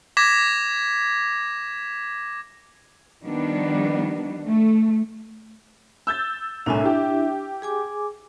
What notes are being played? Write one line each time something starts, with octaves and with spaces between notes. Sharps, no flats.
D6 G#6 A#6 B6 E7
D#3 F3 G3 B3 D4
A3
E6 G6 A6
C2 A2 D4 E4 E5 G#5
G4
G#4 G#5 D6